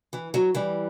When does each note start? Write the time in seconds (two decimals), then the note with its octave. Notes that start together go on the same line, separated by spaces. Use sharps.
0.13 E3
0.34 F#3
0.55 E3 G3